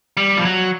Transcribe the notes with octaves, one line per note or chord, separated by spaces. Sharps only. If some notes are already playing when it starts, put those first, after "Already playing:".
G3
F3
F#3